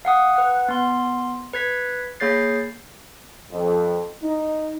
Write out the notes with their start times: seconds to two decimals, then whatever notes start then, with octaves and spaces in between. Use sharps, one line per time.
0.05 F5 F#5 D#6
0.36 B4 F#5
0.68 B3 C6
1.54 B4 G#6 B6
2.20 A#3 G#4 C#5 G6 A6 C7
3.52 F2
4.23 D#4